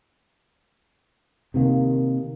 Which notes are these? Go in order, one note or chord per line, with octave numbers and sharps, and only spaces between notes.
C3 D#3 A#3